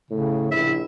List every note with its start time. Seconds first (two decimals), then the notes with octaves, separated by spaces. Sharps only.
0.11 A2 C#3
0.52 A#1 E4 E5